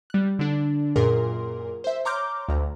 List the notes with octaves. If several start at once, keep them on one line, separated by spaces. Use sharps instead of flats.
G3 F#6
D3 D4
F#2 A#2 G#4 A#4 C6
C5 E5
C#5 A#5 C6 D6 F6 G6
D2 A#5